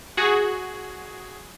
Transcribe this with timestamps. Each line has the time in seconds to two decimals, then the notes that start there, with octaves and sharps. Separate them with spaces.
0.17 F#4 G#4